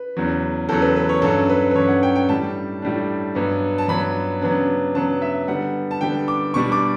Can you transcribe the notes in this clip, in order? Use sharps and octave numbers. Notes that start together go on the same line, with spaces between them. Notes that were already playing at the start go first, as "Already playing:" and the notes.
Already playing: B4
E2 C#3 F#3
E2 C#3 F#3 A4
B4
B4
C#5
G2 F#3 C#4 A4
B4
B4
G2 F#3 C#4 C#5
F#5
G5
G5
A2 G3 D4 A5
A2 G3 D4
G2 F#3 B3
A5
G2 F#3 B3 B5
C#3 F#3 B3 D4
C#3 F#3 B3 D4 A5
E5
D3 G3 B3 F#5
A5
D3 G3 B3 G5
D6
B2 G3 D4 C#6
D6